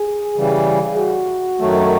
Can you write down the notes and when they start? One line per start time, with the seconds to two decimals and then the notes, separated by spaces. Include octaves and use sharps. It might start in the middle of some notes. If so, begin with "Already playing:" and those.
Already playing: G#4
0.36 C#3 E3 G3
0.97 F#4
1.59 F#2 D#3 F#3 A3